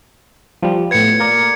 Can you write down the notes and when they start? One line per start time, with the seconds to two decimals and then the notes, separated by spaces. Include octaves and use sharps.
0.63 F3 G3
0.91 A2 B3 G#6 C#7
1.19 A#3 A#4 D5